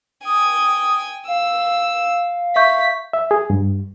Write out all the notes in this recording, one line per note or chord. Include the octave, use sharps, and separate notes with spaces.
G5 G#5 D#6
F5 E6
E5 C#6 G6 B6
E5
G#4
G2